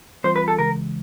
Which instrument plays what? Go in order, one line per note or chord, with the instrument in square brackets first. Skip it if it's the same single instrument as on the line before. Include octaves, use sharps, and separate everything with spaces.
[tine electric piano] E3 G3 C4 F4 [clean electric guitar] C5
[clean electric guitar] B4
A4
[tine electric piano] C#3 E3 G#3 [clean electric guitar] A#4